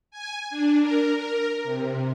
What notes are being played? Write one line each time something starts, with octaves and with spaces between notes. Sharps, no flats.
G#5
D4
A#4
A#4
C3